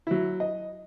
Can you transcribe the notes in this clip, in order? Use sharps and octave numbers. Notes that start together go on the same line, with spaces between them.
F#3 E4
D#5